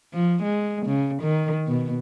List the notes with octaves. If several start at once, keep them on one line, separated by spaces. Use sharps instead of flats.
F3
G#3
C#3
D#3
B2